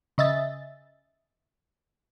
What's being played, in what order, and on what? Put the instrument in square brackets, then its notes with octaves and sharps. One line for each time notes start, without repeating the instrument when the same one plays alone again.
[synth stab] C#3 D#5 E5 A6